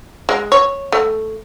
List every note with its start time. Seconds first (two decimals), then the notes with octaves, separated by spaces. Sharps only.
0.29 G#3
0.52 C#5
0.92 A3